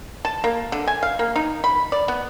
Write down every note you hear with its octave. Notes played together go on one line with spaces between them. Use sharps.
A5
A#3
D3
G#5
F5
A#3
D#4
B5
D5
B3